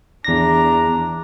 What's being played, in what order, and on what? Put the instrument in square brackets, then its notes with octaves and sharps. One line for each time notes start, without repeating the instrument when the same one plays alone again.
[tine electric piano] E2 A#6 [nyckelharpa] D4 A#5